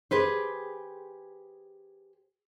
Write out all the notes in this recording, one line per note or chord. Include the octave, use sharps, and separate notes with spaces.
G4 G#4 B4 C5